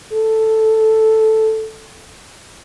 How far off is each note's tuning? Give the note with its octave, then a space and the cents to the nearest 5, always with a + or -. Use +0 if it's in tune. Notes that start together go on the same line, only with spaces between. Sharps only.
A4 +0